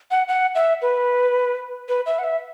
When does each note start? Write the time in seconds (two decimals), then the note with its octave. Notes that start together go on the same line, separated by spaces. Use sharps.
0.11 F#5
0.28 F#5
0.55 E5
0.82 B4
1.89 B4
2.06 E5
2.19 F#5
2.24 E5